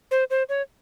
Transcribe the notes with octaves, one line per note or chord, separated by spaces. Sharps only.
C5
C5
C#5